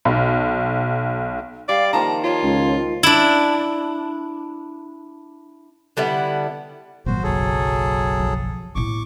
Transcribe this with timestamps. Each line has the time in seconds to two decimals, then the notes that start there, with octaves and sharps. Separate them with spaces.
0.05 B1
1.69 G3 D5 F5
1.93 D#3 F3 A#3 A5 A#5
2.24 F4 C#5
2.43 C#2
3.03 D4 E4
5.97 D3 G3 B3 E4
7.06 G#1 A#2 F#3 F#4 C5
7.23 F#1 B1 F#3 G#4 A4
8.20 F3
8.75 A2 B3 C#6 D6